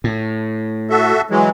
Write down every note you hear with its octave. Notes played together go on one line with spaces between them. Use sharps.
A2
F#4 A4 E5
E3 F#3 G#3